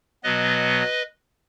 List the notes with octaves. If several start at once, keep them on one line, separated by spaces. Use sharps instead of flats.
B2 F#3 B3 B4 D#5